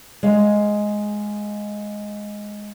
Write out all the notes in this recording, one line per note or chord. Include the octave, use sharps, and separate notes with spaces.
G#3 F5